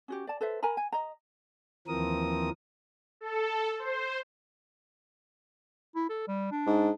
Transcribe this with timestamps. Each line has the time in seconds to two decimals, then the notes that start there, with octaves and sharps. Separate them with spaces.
0.08 C#4 F#4 G4
0.27 D5 A5
0.41 A4 B4 C5 E5
0.63 A#4 G#5 A#5 B5
0.77 G#5
0.92 D#5 A#5
1.88 D#2 E3 F3 C4 A#4 D#6
3.21 A4
3.79 C5
5.96 E4
6.10 A4
6.28 G3
6.51 D4
6.67 G#2